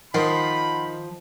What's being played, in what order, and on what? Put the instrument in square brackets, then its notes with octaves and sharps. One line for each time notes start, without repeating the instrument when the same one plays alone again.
[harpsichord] D#3 [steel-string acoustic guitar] F3 [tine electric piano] F#5 C6 [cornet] B5